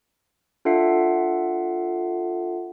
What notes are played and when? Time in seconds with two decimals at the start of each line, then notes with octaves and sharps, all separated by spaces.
0.65 D4 F4 A4 E5 F#5 C7